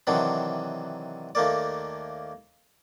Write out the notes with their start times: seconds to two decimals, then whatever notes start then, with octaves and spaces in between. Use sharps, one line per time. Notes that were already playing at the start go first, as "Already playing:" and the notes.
0.07 C3 D#3 E3 F#3 C4 D4
1.35 D#2 A3 A#3 D5